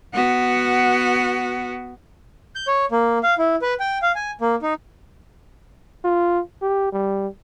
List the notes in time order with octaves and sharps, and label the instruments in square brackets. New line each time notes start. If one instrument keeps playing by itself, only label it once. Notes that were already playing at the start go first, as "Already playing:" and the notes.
[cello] B3 F#4
[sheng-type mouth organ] G6
C#5
A#3
F5
E4
B4
G5
F5
G#5
A#3
D#4
[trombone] F4
G4
G3